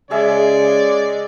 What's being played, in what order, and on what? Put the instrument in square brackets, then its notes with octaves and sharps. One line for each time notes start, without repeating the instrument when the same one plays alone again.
[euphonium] C#3 [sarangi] G#3 [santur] G#4 E5 [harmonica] D5